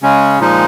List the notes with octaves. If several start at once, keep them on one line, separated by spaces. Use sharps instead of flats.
C#3 G#3 C#4
A#2 F3 G#3 D#4